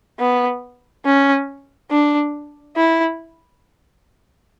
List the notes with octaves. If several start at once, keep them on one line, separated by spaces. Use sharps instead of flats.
B3
C#4
D4
E4